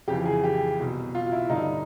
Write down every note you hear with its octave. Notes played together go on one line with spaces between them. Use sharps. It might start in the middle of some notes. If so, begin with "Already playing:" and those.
F2 C#3 E3 G4
G#4
G4
C2 B2
F4
E4
G2 D3 D#4